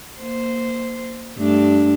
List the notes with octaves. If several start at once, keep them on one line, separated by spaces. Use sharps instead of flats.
A#3 C5
G2 A3 D4